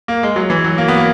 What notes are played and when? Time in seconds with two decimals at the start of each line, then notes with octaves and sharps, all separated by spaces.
0.08 A#3
0.23 G#3
0.36 F#3
0.50 E3
0.64 F#3
0.78 A#3
0.88 B3
0.97 A#3